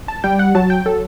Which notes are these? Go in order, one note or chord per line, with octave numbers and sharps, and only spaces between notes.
A5
G3 G5
F#5
F#3 A5
G5
F#3 A4